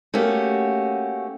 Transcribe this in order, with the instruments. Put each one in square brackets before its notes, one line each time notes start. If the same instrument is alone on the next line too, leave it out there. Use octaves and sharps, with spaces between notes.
[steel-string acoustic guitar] A3 A#3 C#4 F#4 G4